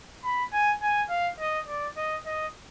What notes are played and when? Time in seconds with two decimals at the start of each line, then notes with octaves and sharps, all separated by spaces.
0.24 B5
0.52 G#5
0.82 G#5
1.10 F5
1.39 D#5
1.68 D5
1.97 D#5
2.26 D#5